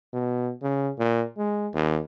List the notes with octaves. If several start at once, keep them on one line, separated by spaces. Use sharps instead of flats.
B2
C#3
A#2
G#3
D#2